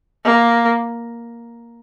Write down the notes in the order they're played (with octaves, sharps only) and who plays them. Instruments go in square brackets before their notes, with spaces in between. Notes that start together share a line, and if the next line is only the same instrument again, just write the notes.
[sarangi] A#3